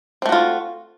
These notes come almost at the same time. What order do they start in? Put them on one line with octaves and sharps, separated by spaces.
C4 A3 F#4 F4